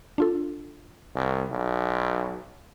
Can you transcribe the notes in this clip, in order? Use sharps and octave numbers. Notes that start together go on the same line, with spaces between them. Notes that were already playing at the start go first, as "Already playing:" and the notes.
D4 F4 A4
C2
B1